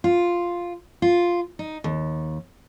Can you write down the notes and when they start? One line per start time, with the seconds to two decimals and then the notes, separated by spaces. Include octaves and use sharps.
0.04 F4
1.02 F4
1.59 D#4
1.84 D#2